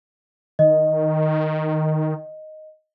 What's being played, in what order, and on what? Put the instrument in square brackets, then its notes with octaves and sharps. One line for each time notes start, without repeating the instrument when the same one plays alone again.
[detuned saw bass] D#3 [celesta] D#5